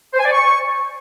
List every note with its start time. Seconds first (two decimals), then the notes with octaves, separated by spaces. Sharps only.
0.13 C5
0.19 G#5
0.25 D5
0.31 C#6